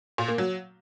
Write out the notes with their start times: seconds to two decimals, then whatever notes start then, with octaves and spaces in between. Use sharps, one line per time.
0.18 A#2
0.28 A#3
0.38 F#3